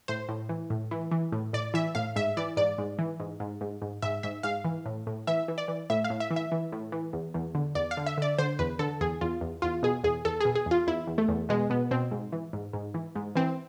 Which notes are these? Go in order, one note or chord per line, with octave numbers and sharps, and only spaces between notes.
A2 C5
A2
E3
A2
E3
E3
A2
A2 D5
E3 E5
A2 F5
G#2 E5
E3 D5
G#2 D5
G#2
E3
G#2
G#2
G#2
G#2
G#2 E5
G#2 E5
G#2 F5
E3
A2
A2
E3 E5
E3
D5
E3
A2 E5
F5
A2
E5
E3
E5
E3
A2
E3
E2
E2
D3
E2 D5
F5
D3
E5
D3 D5
D3 C5
E2 B4
D3 A4
E2 G#4
E2 F4
E2
E2 F4
B2 G#4
E2 G#4
E2 A4
B2 G#4
G#4
E2 F4
E2 E4
E2
A3
E2
B2 G#3
B2 B3
B2 C4
G#2
E3
G#2
G#2
E3
G#2
E3 C4